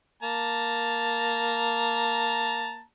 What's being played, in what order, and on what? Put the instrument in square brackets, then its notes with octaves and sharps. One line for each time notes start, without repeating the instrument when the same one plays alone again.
[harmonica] A#3 A5 A#5